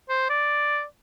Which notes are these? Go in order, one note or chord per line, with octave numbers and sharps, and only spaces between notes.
C5
D5